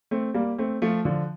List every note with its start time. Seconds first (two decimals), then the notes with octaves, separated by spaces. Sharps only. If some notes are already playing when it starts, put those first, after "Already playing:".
0.11 A3 C4
0.34 G3 A#3
0.58 A3 C4
0.82 F3 A3
1.05 D3 F3